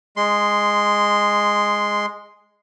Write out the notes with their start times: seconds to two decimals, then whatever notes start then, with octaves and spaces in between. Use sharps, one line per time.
0.17 G#3 C6